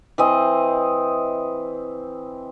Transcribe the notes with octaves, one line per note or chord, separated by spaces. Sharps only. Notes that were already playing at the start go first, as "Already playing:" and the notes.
E3 C4 D#5